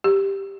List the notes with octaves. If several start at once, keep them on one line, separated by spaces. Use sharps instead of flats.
G4